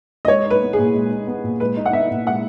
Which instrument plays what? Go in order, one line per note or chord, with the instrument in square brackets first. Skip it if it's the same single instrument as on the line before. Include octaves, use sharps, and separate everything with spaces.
[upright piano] D#5
[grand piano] G#3 [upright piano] C#5
[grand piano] D#4 [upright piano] B4
[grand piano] B3
[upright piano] G#4
[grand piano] A#2
G#3
D#4
B3
A#2
[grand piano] G#3 [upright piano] B4
[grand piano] D#4
[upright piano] F#5
[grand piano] B3 [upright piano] E5
[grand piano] A#2
[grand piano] G#3 [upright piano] F#5